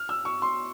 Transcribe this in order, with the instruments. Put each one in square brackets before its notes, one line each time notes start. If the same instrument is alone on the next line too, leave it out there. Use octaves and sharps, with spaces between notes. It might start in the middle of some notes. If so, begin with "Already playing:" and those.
Already playing: [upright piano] F6
E6
C#6
C6